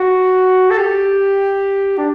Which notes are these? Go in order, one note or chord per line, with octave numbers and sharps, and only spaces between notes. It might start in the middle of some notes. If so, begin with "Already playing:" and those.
Already playing: F#4
A4
G4
D4